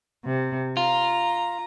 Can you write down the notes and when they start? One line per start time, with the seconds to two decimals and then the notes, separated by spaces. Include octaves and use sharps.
0.23 C3
0.77 F4 A#5